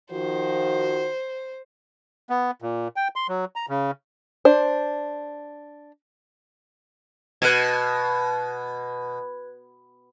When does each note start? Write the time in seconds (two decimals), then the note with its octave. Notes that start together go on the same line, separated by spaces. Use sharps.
0.12 D#3 F3 F#4 C5
2.30 B3
2.62 A#2
2.96 G5
3.16 C6
3.28 F#3
3.56 A#5
3.69 C#3
4.45 D4 C5
7.42 B2 B4 G#6